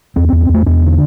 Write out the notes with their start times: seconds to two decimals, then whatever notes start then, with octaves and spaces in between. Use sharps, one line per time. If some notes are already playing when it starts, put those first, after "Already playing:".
0.16 E2 C4
0.28 C4
0.33 E2
0.41 C4
0.49 E2 A3
0.66 E2 D4
0.83 D3